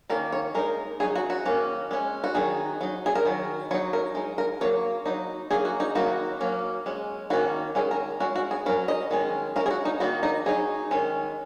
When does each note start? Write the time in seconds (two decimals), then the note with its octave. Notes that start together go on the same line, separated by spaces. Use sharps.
0.10 D#3 A#3 C#4 A#4
0.32 C#5
0.55 G#3 D#4 A#4
1.00 F#3 D#4 G#4
1.15 F#4
1.30 F#4
1.45 D#3 A#3 C#4
1.91 G#3 C#4
2.24 F#4
2.35 D#3 F#3 D#4 G#4
2.81 F#3 D#4
3.06 G#4
3.15 A#4
3.25 D#3 F#3
3.71 F#3 C#5
3.74 D#4
3.93 A#4
4.15 G#3 D#4
4.38 A#4
4.61 F#3 A#3 C#5
5.06 F#3 D#4
5.51 F#3 A#3 D#4 G#4
5.65 F#4
5.80 D#4
5.95 D#3 F#3 A#3 D#4 F#4
6.41 F#3 A#3 C#4
6.86 G#3 C#4
7.30 D#3 A#3 C#4 F#4
7.75 D#3 G#3 C#4 G#4
7.91 A#4
8.20 G#3 C#4 F#4
8.35 F#4
8.51 G#4
8.66 F#3 A#4
8.69 C#4
8.88 D#5
9.11 D#3 G#3 C#4
9.56 C#4 A#4
9.60 G#3
9.66 G#4
9.71 F#4
9.85 D#4
10.00 D#3 A#3 D#4 F#4
10.23 D#4
10.46 F#3 D#4 G#4
10.91 D#3 G#3 C#4